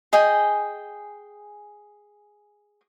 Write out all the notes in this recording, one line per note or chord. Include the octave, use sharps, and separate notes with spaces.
G#4 D#5 G5 G#5